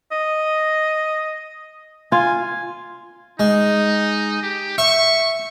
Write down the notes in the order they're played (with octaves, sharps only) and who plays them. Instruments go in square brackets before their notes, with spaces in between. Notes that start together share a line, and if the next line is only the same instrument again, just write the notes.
[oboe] D#5
[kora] F4 [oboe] G#5
[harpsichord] G#3 [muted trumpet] D#4
[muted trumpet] G4
[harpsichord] E5 [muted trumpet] C#6